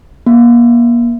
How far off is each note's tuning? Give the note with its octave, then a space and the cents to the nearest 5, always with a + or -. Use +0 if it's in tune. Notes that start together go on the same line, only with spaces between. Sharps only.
A#3 +35